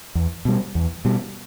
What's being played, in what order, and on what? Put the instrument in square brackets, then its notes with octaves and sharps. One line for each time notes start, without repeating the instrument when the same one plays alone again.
[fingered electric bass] E2
B2 G3
E2
B2 G3